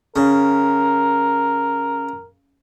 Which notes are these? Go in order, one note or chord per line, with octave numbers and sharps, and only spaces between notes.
C#3 A#4